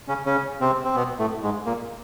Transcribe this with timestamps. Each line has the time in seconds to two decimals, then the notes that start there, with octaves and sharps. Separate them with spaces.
0.08 C#3 C#4
0.26 C#3 C#4
0.61 C3 C4
0.84 C4
0.96 B2 B3
1.19 A2 A3
1.43 G#2 G#3
1.66 A#2 A#3